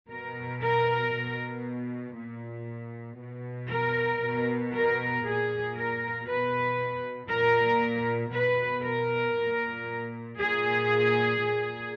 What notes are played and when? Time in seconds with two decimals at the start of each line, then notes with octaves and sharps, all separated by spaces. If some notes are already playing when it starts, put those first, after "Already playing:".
0.10 B2 A#4
0.62 A#4
1.14 B2
2.17 A#2
3.20 B2
3.70 A#4
4.23 B2
4.74 A#4
5.25 A#2 G#4
5.77 A#4
6.28 B2 B4
7.31 A#2 A#4
8.34 B2 B4
8.85 A#4
9.38 A#2
10.40 A#2 G#4
11.43 A#2